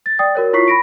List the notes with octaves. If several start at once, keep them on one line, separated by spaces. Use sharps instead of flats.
A6
D5 G5 D#6 A6
F#4 A#4 C#5
E4 F4 C#5 C#6 B6 C7
B5 A#6 D7